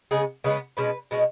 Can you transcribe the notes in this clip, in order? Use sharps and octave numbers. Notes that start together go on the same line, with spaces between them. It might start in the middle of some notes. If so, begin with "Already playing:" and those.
C#3 G#3 B3 G#4
C#3 G#3 B3 B4
B2 G#3 C#4 B4
B2 G#3 C#4